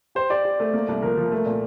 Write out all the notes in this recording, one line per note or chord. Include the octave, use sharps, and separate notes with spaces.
G4 C5
G4 D5
G4
A3
A#3
C2
F3 A#4
F3
A3
A#2